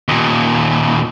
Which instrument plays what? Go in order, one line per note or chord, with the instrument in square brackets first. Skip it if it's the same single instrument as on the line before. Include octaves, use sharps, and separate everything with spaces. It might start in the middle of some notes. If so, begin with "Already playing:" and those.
[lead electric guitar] D#2 A#2